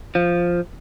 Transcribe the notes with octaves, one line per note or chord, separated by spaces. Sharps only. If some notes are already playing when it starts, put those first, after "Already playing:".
F3